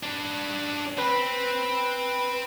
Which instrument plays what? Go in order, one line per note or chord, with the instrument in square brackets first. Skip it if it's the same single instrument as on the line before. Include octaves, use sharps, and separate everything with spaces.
[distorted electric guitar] D4 B4
[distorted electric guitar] C4 [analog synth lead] B4